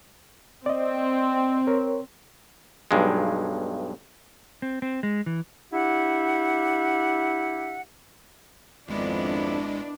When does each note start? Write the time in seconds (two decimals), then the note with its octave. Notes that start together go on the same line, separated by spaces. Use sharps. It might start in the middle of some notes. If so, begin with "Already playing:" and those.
0.66 C4 D5 D#5
1.67 A#4 C#5
2.91 B1 G2 G#3
4.62 C4
4.82 C4
5.03 G#3
5.26 E3
5.73 D4 E4 G4 E5 F#5
8.88 G#1 F2 D#3 G#3 B3 D4 E4